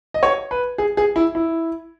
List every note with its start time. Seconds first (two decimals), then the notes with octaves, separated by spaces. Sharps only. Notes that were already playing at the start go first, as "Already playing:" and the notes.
0.14 D#5
0.23 C#5
0.51 B4
0.78 G#4
0.97 G#4
1.16 E4
1.35 E4